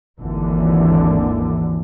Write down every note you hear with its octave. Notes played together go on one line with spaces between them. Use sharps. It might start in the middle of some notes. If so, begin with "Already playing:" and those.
G#1 D#2 D3 E3